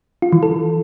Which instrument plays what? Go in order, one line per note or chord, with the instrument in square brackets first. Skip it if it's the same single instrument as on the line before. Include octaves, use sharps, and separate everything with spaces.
[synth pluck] F4
E3
A4